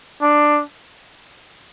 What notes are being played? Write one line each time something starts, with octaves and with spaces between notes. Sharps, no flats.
D4